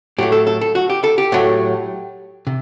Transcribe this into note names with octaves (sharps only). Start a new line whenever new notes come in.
A2 F#3 A3 G4
A4
A4
A4
F#4
G4
A4
G4
A2 F#3 A3
C3